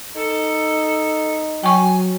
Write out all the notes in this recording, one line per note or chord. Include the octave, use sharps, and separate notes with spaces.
D#4 A4
F#3 G5 G#5 C#6